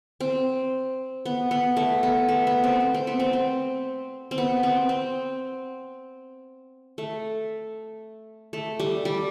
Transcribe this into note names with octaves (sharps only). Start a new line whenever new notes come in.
C4
B3
B3
A3
B3
A3
B3
C4
C4
C4
B3
C4
C4
C4
B3
C4
C4
A3
A3
G3
G3